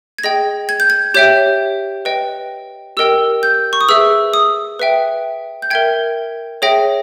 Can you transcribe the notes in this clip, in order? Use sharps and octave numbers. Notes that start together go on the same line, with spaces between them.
G#6
G#4 D#5 G5 A#6
G#6
G6
G#6
G4 C#5 E5 G5 G6
B4 D#5 G5
G4 A#4 D#5 G5 E6
G6
C#6
D#6
G#4 B4 E5 E6
D#6
B4 E5 G5
G6
A#4 E5 G5 G#6
G#4 C#5 E5 G5 A#6